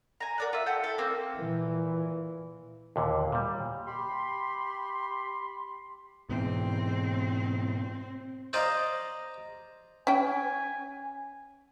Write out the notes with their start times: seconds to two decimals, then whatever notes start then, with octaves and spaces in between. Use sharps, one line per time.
0.20 G#5 A#5
0.38 A#4 D5 F#5
0.53 F4 E5
0.66 A4 F#5 G5 G6
0.83 E4 A4
0.98 A#3 C4
1.38 A#2 E3
2.96 D#2 A#2 D3
3.32 A#2 G3
3.86 G4 B5 C6
6.29 G#2 B2 E3 C4
8.53 C5 D5 D#5 F5 A#5
10.07 C#4 G5 G#5